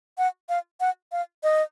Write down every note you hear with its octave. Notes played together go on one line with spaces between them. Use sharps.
F#5
F5
F#5
F5
D#5